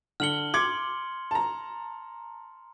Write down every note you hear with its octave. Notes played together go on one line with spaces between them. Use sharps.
D3 F6 C#7 F#7 G7
C6 D6 G#6 C#7
A5 A#5